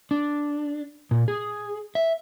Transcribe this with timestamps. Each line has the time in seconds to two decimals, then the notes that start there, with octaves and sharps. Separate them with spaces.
0.11 D4
1.11 A#2
1.28 G#4
1.95 E5